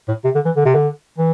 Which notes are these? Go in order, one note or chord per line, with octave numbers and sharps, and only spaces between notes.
A2
C3
D3
E3
D3
C3
D3
E3